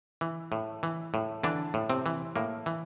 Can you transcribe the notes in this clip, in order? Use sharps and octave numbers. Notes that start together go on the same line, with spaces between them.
E3
A2
E3
A2
D3 E3 D4
A2
C3 C4
E3
A2 A#3
E3